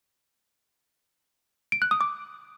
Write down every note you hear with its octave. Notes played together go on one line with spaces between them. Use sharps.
D7
F#6
D#6
D6